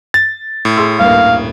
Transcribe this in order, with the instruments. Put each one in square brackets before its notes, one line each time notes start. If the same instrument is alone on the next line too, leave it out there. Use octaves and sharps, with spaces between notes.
[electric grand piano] A6
A2
[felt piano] G#4 C6 E6
[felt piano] D#1 G2 A#3 [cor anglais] F5